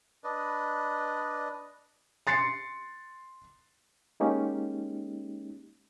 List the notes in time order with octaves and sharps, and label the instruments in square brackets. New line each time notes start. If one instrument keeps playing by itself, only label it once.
[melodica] D4 B4 D5 D#5
[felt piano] C6 A6 C7 C#7
[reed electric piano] G#3 A#3 C#4 D#4 G4